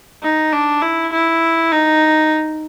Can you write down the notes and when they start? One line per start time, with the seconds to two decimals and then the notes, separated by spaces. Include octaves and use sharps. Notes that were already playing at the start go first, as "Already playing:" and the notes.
0.23 D#4
0.53 D4
0.82 E4
1.12 E4
1.72 D#4